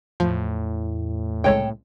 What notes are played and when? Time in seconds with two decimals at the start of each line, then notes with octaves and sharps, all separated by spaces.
0.20 E2 A2 F3
1.44 C2 C#3 G#3 A4 C#5 G5